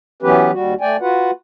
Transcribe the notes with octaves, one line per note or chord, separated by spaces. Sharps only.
E3 F#3 B3 C#4 G4 B4
D#2 G3 F#4
A3 D5 G5 G#5
F4 F#4 B4 F#5